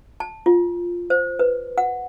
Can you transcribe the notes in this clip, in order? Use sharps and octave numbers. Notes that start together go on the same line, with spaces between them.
A5
F4
C5
B4
F#5